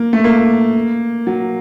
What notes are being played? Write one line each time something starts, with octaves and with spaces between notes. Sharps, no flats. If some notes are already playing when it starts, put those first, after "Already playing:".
Already playing: A#3
A3
A#3
F#3